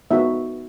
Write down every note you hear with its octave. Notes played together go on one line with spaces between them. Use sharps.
B3 D#4 F#4 E5